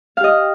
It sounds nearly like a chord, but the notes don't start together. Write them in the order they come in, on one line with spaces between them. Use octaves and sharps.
F5 G4 D#5